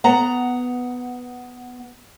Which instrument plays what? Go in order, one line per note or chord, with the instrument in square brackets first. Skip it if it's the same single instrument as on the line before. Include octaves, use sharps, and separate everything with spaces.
[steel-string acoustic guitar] B3 F#5 A#5